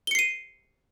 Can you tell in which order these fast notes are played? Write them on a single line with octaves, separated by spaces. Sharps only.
G7 C#7 C7 D#7